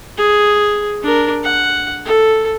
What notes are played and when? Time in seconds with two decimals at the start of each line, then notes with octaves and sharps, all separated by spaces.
0.18 G#4
1.03 D4 A#4
1.44 F#5
2.05 A4